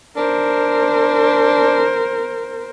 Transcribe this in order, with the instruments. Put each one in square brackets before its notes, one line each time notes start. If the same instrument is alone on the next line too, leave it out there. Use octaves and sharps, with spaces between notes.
[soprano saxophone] D4 [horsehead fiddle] A#4 C5